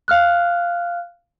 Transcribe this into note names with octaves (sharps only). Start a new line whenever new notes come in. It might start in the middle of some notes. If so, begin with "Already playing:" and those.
F5 F6 F#6